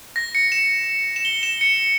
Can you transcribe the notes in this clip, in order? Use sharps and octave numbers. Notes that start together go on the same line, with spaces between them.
A#6
C#7
E7
E7
G7
E7
C#7